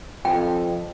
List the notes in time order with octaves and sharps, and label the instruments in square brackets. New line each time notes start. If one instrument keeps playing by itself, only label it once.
[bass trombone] F2 [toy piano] G5